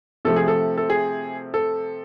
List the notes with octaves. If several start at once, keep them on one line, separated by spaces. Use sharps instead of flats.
C3 F3 A3 A4
G#4
A4
A4
G#4
A4